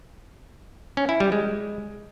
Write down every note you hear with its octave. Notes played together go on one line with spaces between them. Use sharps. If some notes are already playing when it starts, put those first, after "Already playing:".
C#4
E4
G3
G#3